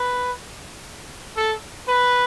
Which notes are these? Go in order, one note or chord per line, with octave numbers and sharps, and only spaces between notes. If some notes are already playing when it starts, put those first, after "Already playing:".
Already playing: B4
A4
B4